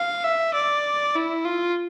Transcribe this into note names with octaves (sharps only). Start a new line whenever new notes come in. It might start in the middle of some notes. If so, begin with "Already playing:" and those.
Already playing: F5
E5
D5
E4
F4